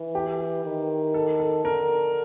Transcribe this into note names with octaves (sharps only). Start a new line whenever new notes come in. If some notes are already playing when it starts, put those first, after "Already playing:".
Already playing: E3
G4
D#3
A4
A4
D3 A#4